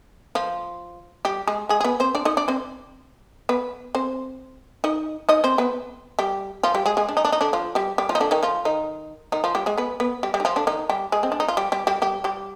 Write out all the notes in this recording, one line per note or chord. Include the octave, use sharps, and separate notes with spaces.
F3 F4
G3 G4
G#3 G#4
G#3 G#4
G#4
B3 B4
C4 C5
D4 D5
D#4 D#5
D4 D5
C4 C5
B3 B4
C4 C5
D#4 D#5
D#4 D#5
C4 C5
B3 B4
G3 G4
F3 F4
G3 G4
G#3 G#4
G#3 G#4
D4
D#4
D4
D#4
D3 D4
F3 F4
G3 G4
G3 G4
F3 F4
D#4
D3 D4
D#3 D#4
F3 F4
D#3 D#4
D#3 D#4
F3 F4
G3 G4
G#3 G#4
B3 B4
B3 B4
G3 G4
G3 G4
D#4
F3 F4
D3 D4
D#3 D#4
G3 G4
G#3 G#4
C4
D4
D#4
F4
G3 G4
G3 G4
G3 G4
G3 G4
G3 G4